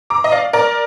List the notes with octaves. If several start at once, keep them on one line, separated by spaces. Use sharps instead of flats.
A#5 D6
D#5
D5 F5
A#4 D5